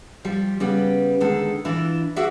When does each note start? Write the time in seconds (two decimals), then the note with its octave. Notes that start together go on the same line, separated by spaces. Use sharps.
0.25 F3 G3 G4
0.60 C#3 G3 B3 G4
1.21 D3 D#3 G#3 A4
1.65 E3 D4 E4 F4
2.16 F#4 G#4 D5 E5 F#5